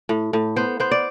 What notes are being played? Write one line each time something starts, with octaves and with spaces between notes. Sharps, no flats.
A2
A2
B3 C5
B3 C5
D5